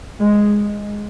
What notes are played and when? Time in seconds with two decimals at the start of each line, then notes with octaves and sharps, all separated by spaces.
0.20 G#3